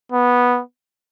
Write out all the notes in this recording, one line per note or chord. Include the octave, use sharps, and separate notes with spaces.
B3